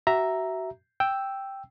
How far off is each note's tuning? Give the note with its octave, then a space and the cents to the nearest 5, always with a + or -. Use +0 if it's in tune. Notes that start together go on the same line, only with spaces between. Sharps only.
F#4 +30 E5 +0 A#5 +0
G5 +0 E6 +0